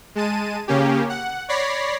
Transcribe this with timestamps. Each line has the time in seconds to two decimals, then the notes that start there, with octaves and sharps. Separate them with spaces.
0.15 G#3 A5 D#7
0.68 C#3 A#3 C#4 G4
1.09 F#5
1.49 C#5 D5 B5 A#6 C7